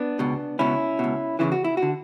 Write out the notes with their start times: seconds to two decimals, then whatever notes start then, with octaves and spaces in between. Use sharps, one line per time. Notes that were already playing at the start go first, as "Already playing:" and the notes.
Already playing: B3 D4
0.19 C#2 B2
0.59 C#2 B2 C#4 E4
0.99 C#2 B2
1.39 E2 C#3 E3 E4
1.52 F#4
1.64 E4
1.77 F#4
1.82 D3